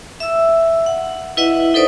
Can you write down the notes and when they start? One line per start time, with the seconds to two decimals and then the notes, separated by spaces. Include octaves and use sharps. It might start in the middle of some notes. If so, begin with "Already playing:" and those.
0.20 E5 E6
0.86 F#5
1.37 E4 B4 D#5 E5 F#5
1.74 D#4 A4 B4 C5 D5 D#6